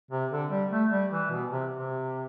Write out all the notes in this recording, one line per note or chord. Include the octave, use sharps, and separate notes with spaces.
C3
D3
G3
A3
G3
E3
B2
C3
C3